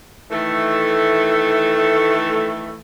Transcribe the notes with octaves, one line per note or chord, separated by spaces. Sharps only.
D#3 E3 A3